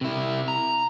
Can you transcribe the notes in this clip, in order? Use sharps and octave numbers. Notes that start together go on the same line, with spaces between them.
C3 E4
A#5